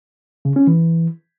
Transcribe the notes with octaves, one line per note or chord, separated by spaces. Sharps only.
C#3
C#4
E3